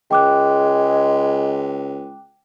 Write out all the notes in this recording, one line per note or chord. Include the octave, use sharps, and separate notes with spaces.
C#2 G#3 G5 D6 F#6